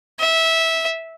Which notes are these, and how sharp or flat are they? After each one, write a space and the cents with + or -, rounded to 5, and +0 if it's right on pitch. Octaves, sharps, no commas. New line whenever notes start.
E5 -15